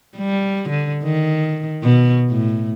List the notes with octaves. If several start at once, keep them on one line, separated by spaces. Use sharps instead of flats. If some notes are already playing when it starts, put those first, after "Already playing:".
G3
D3
D#3
B2
A2